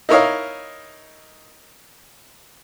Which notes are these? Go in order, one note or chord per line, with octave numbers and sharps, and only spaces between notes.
D#4 E4 A#4 C#5 D#5 F5